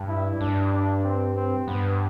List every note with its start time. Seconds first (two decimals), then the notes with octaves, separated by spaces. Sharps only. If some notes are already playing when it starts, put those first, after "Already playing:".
Already playing: G2
0.09 E4
0.41 G2 D4
0.73 D4
1.03 C4
1.35 C4
1.67 G2 B3